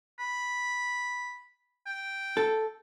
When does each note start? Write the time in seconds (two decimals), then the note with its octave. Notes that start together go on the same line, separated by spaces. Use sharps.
0.19 B5
1.86 G5
2.37 A4